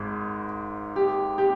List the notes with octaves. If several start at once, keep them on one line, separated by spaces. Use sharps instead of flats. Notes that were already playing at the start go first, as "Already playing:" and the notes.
Already playing: G#1 G#2
G4
G4